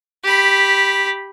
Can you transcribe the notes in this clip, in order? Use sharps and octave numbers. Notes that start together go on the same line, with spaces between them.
G4 B5